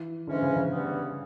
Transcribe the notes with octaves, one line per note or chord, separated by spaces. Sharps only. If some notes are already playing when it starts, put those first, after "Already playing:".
Already playing: E3
G#2 D3 E3 G#3 C#4
C#3
C#3
G2 E3 G3 B3